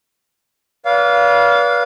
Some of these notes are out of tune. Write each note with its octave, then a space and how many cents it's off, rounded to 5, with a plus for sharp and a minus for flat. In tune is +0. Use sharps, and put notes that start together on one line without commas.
B4 -30 D5 -35 F5 +0